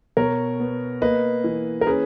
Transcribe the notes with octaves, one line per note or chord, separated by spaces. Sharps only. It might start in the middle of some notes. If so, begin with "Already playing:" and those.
B2 A#4 C#5
B3
A#3 B4 D#5
E3
A#4
C#4 G#4 B4